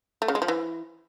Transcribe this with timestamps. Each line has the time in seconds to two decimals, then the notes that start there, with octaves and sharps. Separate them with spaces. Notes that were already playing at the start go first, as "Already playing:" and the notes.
0.22 A3
0.28 C#3
0.35 G#3
0.42 F3
0.48 E3